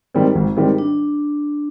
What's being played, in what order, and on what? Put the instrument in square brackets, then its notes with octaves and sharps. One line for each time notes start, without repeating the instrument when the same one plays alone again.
[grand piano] G#2 D#3 G3 C4
G#1
G#2 D#3 G3 C4
[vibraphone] D4